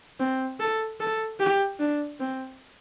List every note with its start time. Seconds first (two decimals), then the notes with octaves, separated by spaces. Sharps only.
0.20 C4
0.60 A4
1.00 A4
1.39 G4
1.79 D4
2.20 C4